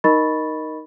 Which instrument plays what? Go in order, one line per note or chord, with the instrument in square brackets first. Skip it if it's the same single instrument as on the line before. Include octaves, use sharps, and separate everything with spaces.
[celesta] D#4 A#4 D#5 B5 C#6 A6